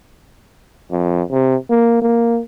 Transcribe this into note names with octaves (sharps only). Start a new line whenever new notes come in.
F2
C3
A#3
A#3